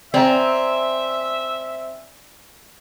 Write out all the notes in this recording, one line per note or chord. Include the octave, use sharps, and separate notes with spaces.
C4 D5 E5 G#5 A#5